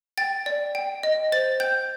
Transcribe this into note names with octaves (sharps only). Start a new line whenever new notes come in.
G5 A6
D5
G5
D#5
C5 A6
G5 G6